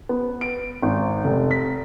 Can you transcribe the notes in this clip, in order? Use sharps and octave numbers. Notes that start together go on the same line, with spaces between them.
B3
D7
G#1
F1
B6